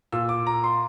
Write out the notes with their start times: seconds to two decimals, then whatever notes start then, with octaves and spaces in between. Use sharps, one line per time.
0.12 A#2 E6
0.29 D6
0.47 A#5
0.64 C6